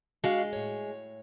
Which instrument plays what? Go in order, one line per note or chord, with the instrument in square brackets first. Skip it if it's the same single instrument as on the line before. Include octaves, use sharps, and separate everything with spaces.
[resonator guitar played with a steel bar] G#3 [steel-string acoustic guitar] D4 F#4 F5
[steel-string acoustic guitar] A2 C#5